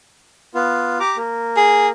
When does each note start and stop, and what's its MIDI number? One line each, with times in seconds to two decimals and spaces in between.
0.55 0.98 59
0.55 0.98 65
1.00 1.17 67
1.00 1.17 82
1.00 1.17 86
1.17 1.91 58
1.57 1.88 68